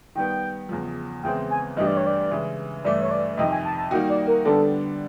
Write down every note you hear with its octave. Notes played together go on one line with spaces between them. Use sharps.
D#3 G3 B3 G5
E2 C#3 F3
E2 C#3 E3 G#3 C4 G5
G#5
G2 E3 A3 D4 G4 D#5
D5
C#5
D5
C#3 E3 G#3
G2 E3 A3 D5
C#5
D5
F2 C3 D#3 D#5
G#5
A5
A5
D#3 G3 A#3 D#4 F#4 G5
D5
A#4
D3 G3 B3 D4 A4